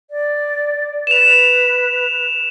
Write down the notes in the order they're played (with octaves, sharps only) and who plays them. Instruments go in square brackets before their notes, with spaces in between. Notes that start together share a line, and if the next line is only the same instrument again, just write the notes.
[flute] D5
[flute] B4 [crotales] E7 F7